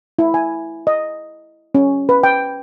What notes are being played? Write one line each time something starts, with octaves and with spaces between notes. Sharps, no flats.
E4
G#5
D#5
C#4
B4
G5